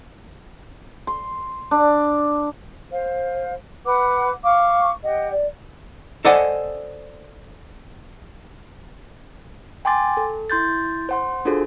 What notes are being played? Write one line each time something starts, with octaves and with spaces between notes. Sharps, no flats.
C6
D4
C5 F5
B4 F#5 D6
F5 C#6 D6
G4 D#5 F#5
D5
A4 C5 D5 D#5 F#5 G#5
G5 G#5 C6 D6 A6
A4
E4 C6 G6 A6
C5 F#5 C6
D4 F4 F#4 G#4 A4 C5